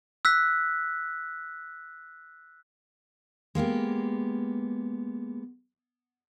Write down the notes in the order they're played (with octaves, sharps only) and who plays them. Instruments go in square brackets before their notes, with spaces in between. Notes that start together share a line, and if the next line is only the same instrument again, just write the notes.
[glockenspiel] E6 F#6 B6
[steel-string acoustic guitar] G#3 A#3 B3 G4